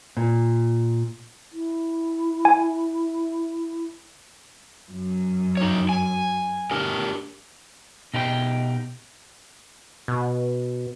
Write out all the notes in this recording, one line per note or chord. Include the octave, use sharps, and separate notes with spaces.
A#2
E4
G#5
F#2
D#4 C#5
G#5
D4 G4 A#4
B2 D#4 G4 B4 G5
B2